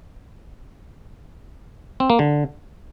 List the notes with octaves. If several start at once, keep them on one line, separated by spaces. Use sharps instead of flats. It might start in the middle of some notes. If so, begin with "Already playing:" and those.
C4
A#3
D3